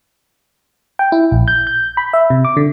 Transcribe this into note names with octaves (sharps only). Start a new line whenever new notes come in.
G5
E4
A#1
G6
G6
B5
E5
C3
D6
D3